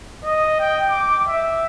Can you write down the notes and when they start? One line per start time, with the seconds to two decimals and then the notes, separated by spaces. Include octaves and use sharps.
0.24 D#5
0.60 G5
0.90 D6
1.28 E5